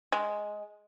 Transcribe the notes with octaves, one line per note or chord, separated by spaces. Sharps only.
G#3